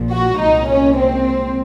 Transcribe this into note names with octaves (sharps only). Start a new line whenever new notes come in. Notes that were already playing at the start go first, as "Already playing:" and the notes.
Already playing: A#1 A#2 F3
F#4
C2 A#2 G#3 D#4
C#4
C4